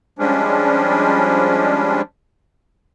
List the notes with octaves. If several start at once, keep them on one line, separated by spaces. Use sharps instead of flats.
F3 G3 G#3 C#4 D4